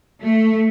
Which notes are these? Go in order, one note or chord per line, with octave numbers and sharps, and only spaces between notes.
A3